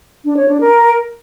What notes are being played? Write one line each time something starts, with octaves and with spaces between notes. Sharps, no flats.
D4
C#5
D4
A#4